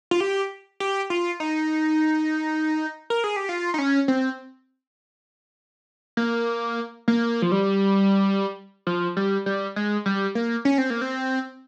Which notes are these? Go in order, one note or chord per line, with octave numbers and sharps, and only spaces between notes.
F4
G4
G4
F4
D#4
A#4
G#4
G4
F4
D#4
C#4
C4
A#3
A#3
F3
G3
F3
G3
G3
G#3
G3
A#3
C#4
C4
A#3
C4